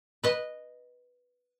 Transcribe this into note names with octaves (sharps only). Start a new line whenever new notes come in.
B4 D#5